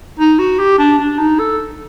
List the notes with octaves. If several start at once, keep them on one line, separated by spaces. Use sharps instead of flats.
D#4
F#4
G4
D4
D4
D#4
A4